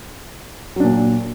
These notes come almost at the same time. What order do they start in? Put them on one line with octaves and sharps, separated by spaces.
F#3 D4 A#2